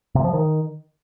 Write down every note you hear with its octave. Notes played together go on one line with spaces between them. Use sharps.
C3
F3
D#3